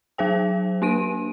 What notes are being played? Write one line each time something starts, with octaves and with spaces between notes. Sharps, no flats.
F#3 G#4 C5 G5
A#3 D4 D7 D#7